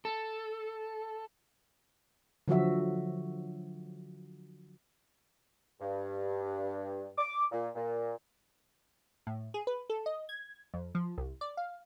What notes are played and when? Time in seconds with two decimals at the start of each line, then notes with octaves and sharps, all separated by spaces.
0.05 A4
2.48 D3 F3 F#3 F#4 E5
5.81 G2
7.18 D6
7.52 A#2
7.75 A#2
9.27 A2
9.54 G#4
9.67 B4
9.90 A4
10.06 D#5
10.29 G#6
10.74 F2
10.95 F3
11.18 C2
11.41 D5
11.57 F5